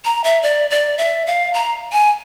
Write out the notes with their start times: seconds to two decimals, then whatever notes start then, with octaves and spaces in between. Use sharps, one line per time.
0.05 A#5
0.24 E5
0.43 D5
0.70 D5
0.98 E5
1.27 F5
1.54 A#5
1.92 G#5